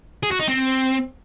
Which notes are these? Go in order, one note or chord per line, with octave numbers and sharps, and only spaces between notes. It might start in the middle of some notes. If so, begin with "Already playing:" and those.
G#4
F#4
D#4
C4